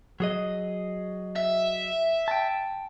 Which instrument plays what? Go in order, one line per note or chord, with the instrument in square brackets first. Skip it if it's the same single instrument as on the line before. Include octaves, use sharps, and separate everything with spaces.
[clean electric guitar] F#3 G#4 D#5
[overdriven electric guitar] E5
[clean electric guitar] G5 A5